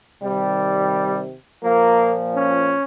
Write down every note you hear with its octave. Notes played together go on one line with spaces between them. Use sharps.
C3 D#3 G3
A#2 F3 A#3
C#4